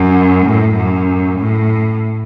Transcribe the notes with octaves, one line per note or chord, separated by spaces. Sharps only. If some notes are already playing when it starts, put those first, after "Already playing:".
Already playing: F#2
A2
F#2
A2